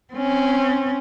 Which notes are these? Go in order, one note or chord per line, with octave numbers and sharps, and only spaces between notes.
C4 C#4